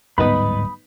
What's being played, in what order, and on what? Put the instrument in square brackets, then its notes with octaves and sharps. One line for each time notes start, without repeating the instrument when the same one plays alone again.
[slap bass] D1 G#2 G3 [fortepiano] B3 D#4 B4 [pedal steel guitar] B5 D#6